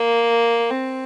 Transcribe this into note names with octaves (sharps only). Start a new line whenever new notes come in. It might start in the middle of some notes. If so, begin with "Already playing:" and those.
Already playing: A#3
C4